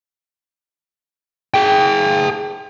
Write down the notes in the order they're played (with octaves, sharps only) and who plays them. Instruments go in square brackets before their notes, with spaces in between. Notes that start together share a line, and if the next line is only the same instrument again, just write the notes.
[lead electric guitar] G#4 G5